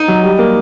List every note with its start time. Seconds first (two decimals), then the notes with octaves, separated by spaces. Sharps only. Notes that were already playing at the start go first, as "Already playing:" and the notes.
Already playing: D#4
0.08 F#3
0.23 G3
0.39 A#3